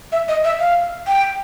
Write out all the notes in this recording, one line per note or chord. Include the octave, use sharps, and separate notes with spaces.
E5
D#5
E5
F5
G5